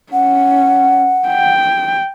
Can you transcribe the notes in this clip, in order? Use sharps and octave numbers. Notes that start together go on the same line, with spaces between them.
C#4 F#5
G5